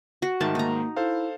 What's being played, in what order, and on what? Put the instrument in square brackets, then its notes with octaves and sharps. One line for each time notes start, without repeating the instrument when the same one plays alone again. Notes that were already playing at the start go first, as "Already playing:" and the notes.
[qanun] F#4
[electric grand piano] G#2 D#3 [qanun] A3 A5
[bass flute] A#3 [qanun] D#4 A#5
[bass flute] E4 [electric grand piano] A4 C5 F5